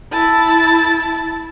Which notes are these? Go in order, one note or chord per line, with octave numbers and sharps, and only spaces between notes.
E4 A5